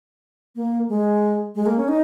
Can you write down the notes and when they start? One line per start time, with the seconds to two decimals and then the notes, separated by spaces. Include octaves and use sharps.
0.56 A#3
0.89 G#3
1.55 G#3
1.66 A#3
1.77 C#4
1.88 D#4